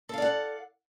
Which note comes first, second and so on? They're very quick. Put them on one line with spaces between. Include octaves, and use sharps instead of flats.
A4 F5 D5 F#5